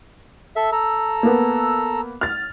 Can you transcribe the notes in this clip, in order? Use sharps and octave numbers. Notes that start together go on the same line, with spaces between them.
A4 E5
A4 A#5 E6
A#3 B3
F6 A6